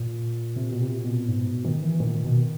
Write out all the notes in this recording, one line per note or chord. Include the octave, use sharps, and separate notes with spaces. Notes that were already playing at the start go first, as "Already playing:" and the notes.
Already playing: A#2
C3
B2
C3
B2
G#2
D#3
E3
A#2 D#3
B2